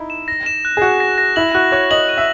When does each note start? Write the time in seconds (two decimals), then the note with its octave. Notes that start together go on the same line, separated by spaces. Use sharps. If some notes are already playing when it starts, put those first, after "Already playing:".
Already playing: D#4 E4
0.10 E7
0.28 A#6
0.46 E7
0.65 F#6
0.77 G#4
0.82 F#4 F#6
1.00 A#6
1.18 A#6
1.36 E4 F#7
1.55 F#4 F#6
1.72 C#5 F#6
1.91 D#5 F#7
2.09 D#7
2.18 E5